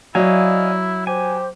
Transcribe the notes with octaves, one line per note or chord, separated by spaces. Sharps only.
F#3 E4 D5 D#5 F5 G#5
G4 C5 G#5